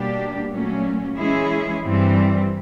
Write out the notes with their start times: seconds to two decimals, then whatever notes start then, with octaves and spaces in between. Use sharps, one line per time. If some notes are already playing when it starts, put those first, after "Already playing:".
Already playing: B2 G3 A#3 D4 G4
0.50 A#2 F#3 A3 C#4
1.17 E3 G#3 C#4 E4 G#4
1.84 G2 E3 G3 C4